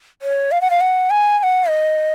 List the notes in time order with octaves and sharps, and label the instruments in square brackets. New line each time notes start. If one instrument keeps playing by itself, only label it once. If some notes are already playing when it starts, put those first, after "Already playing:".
[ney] C#5
F5
F#5
F5
F#5
G#5
G#5
F#5
D#5